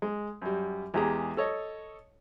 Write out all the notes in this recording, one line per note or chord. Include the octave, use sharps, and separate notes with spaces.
G#3
F#2 G3
E2 G#3 G4 G#4 A#5
A4 C#5 D#5